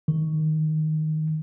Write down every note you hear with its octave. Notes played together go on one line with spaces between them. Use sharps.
D#3